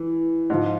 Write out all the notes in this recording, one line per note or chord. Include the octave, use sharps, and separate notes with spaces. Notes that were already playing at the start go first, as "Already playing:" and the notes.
Already playing: E3
G#2 F3